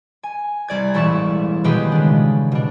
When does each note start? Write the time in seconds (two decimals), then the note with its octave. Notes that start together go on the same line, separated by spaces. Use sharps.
0.23 G#5
0.68 C2 D5 G#6
0.94 E1 A1 E4 C#6 A6 E7
1.64 B2 D#3 G#3 B3 G4 G#4
1.92 C#3 D4
2.52 B2 D4